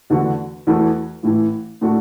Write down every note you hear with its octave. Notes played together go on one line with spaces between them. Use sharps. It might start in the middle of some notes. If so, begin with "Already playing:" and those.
E2 D3 A3 D4 F#4
E2 E3 A3 F#4
A1 A2 E3
A2 A3 D4 F#4